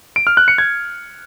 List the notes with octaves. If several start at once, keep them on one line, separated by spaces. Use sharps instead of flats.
D7
F6
F#6
C#7
G#6